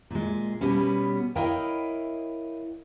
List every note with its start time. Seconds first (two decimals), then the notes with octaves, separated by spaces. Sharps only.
0.11 A#2 G#3
0.61 B2 G3 B3 C#4
1.35 E4 A#4 C#5 D#5 F5 G5